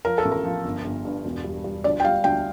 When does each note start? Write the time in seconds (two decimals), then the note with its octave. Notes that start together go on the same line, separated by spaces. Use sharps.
0.05 F3 A#4
0.18 A4
0.25 A1
0.32 A#4
0.44 F3
0.65 G1
0.84 G1
1.05 G2
1.25 E1
1.44 G3
1.64 G3
1.84 D2 D5
2.00 G5
2.04 G3 F5
2.24 D2 G5